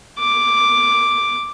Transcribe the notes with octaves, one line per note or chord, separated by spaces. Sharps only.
D6